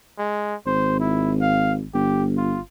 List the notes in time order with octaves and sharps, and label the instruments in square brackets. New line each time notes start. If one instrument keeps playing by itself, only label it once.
[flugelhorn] G#3
[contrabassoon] G#1 [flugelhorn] C5
[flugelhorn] E4
F5
[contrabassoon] G1 [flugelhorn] G4
[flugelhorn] F4